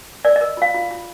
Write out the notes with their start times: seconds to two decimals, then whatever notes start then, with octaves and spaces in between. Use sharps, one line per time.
0.24 A#4 D5
0.36 A#4 D#5
0.57 F4 F5
0.75 F4
0.91 F4